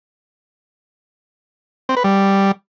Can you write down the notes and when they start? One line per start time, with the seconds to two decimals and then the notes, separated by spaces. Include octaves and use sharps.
1.89 C4
1.97 B4
2.04 G3